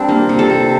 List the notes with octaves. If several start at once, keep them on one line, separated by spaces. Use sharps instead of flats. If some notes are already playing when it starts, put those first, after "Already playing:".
Already playing: G3 C4 D4
A#3
C3
A4
C3